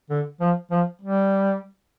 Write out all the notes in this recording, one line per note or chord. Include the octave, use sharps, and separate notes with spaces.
D3
F3
F3
G3